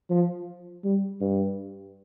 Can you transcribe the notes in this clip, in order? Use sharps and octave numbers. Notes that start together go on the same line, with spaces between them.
F3
G3
G2